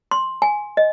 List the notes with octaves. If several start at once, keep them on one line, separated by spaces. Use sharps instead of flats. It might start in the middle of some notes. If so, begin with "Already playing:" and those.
C6
G#5
D#5